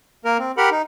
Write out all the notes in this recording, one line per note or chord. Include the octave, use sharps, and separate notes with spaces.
A#3 A#4
C4
G4 A#4 F#5 B5
D#4